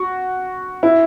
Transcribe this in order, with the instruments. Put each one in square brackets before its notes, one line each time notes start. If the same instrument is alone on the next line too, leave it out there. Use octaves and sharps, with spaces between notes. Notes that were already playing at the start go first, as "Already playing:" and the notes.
Already playing: [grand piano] F#4
E4